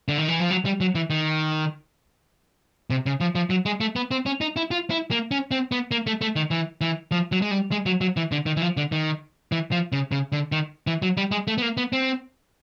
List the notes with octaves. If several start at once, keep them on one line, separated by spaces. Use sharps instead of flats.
D3
D#3
E3
F3
F#3
G3
F#3
E3
D#3
C3
C#3
F3
F3
F#3
G#3
A3
B3
C4
C#4
D#4
E4
F4
E4
A#3
C#4
C4
B3
A#3
A3
A3
D#3
E3
E3
F3
F#3
G#3
G3
G#3
F#3
F#3
E3
D3
D#3
E3
F3
D3
D#3
E3
F3
C#3
C#3
D3
D#3
E3
F#3
G3
G#3
A3
B3
A#3
B3
C4